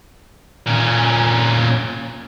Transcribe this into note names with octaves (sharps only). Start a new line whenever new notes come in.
A#2 C#4